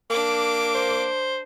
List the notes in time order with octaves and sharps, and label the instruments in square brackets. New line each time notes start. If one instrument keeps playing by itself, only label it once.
[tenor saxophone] A#3 [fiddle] D4 D6
[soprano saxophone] C5